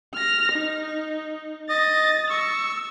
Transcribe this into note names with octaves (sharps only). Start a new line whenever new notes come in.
F6 A#6
D#4
D#5 A6
C#6 E6